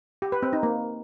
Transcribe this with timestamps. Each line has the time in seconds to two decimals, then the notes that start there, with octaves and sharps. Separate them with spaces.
0.22 G4
0.32 B4
0.43 C4
0.53 D#4
0.63 A#3